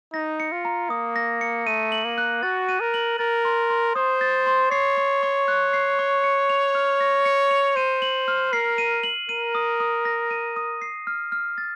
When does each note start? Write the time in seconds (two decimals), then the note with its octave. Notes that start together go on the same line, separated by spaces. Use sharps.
0.13 D#4 A#6
0.40 C#7
0.52 F4
0.65 A#5
0.90 A#3 D#6
1.16 A#6
1.41 C#7
1.67 A3 D#7
1.92 F#7
2.05 A#3
2.18 F#6
2.43 F#4 A6
2.69 D#7
2.80 A#4
2.94 F#7
3.19 A#4 A6
3.45 C6
3.70 C6
3.95 C5 D#6
4.21 A6
4.47 C6
4.71 C#5 C7
4.97 C#6
5.23 C#6
5.48 F#6
5.73 C7
5.99 C#6
6.24 C#7
6.49 F7
6.75 F6
7.00 A#6
7.25 C#7
7.51 F7
7.76 C5 D#7
8.02 F#7
8.28 F6
8.53 A#4 C7
8.78 D#7
9.03 F#7
9.29 A#4 D#7
9.55 D#6
9.80 D#6
10.05 A#6
10.31 D#7
10.56 D#6
10.82 C7
11.07 F6
11.32 F6
11.58 A6